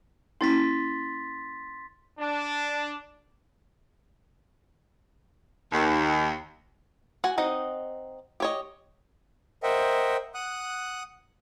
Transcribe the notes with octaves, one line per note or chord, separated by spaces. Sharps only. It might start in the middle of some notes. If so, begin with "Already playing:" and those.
A#3 C#4 E4 C6 A6 B6
D4
D#2
F#4 F#5 G#5
C4 D#4 D#5 F#5
G4 C#5 D#5
A#4 C5 D#5 E5 F#5 G5
F#5 D#6 F#6